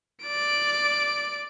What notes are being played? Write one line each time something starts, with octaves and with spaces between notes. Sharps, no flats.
D5 D7